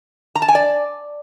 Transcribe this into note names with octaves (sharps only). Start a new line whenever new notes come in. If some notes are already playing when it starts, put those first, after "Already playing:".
A#5
A5
G#5
D5